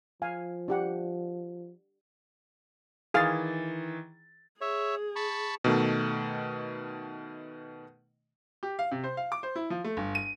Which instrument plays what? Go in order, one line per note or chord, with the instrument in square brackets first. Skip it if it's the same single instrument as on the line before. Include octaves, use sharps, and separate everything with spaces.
[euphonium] F3 [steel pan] F5 G#5
[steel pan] D4 G4 F#5
[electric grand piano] D#3 E3 A6 [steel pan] G#4 F5
[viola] G#4 [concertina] C#5 E5
[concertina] A5 B5 C#6
[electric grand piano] B2 D#3 A3
[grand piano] G4
F5
C3
C5
F5
D6
C5
E4
F3
A3
G1
D#7